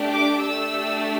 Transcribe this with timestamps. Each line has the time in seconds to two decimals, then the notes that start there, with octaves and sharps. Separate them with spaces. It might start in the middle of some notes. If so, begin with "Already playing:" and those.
Already playing: A3 D4 G4
0.12 D6
0.43 A3 D4 G4 E6